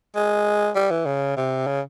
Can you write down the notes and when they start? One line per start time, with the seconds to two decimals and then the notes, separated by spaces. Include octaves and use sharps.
0.15 G#3
0.75 G3
0.91 E3
1.06 C#3
1.36 C3
1.67 C#3